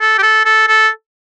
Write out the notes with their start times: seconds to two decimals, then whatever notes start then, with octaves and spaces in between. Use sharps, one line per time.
0.01 A4
0.18 G4
0.22 A4
0.45 A4
0.68 A4